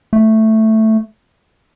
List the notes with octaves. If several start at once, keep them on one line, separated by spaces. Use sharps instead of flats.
A3